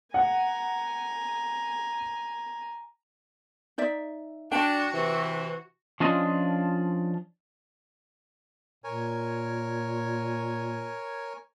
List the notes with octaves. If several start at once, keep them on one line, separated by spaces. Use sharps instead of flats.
F#5 G#5 A#5
D#4 D5 E5
D4 F#4 G5
C3 E3
F3 C#4 D4 F4 D#5
A#2 A#4 C#5 G#5